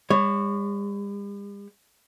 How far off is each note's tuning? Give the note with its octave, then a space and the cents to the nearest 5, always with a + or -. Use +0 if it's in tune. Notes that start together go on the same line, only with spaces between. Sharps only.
G3 +45 C#5 +0